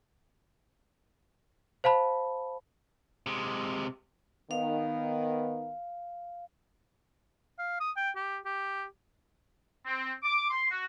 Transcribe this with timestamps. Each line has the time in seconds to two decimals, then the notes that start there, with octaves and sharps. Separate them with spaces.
1.84 C5 F5 A5 B5
3.26 C3 G#3
4.51 D#3 B3 F5
7.59 F5
7.80 D#6
7.97 G5
8.16 G4
8.45 G4
9.85 C4
10.23 D6
10.50 C6
10.71 F#4